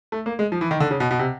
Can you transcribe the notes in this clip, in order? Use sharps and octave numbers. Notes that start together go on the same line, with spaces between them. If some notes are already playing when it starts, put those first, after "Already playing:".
A3
A#3
G#3
F3
E3
D#3
D3
C#3
B2
B2
C3